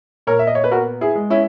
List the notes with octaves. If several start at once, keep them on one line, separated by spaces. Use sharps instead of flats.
A#2 A#4 C#5
E5
D#5
C#5
B4
B3 F#4 A#4
E4 G#4
G#3
C#4 E4